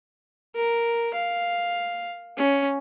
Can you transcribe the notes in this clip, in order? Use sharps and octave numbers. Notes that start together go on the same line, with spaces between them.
A#4
F5
C#4